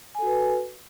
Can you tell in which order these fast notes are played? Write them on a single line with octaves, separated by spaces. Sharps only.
G#5 A4 F#4 B4